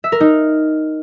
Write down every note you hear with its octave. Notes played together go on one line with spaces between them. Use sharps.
E5
A#4
D#4